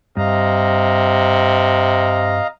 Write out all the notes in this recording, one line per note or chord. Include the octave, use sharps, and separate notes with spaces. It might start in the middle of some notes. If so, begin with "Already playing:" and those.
G2 C3 D#5 F5 A#5